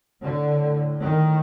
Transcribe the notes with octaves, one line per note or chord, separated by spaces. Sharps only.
A2 D3
D#3